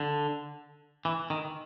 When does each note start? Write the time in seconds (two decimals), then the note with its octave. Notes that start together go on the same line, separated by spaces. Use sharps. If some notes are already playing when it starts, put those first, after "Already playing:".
Already playing: D3
1.05 E3
1.30 D#3